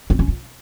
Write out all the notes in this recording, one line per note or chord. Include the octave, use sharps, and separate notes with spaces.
C4
C#4
F4